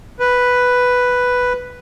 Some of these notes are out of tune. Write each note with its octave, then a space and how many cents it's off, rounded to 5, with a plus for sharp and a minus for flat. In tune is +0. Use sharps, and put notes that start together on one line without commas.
B4 +0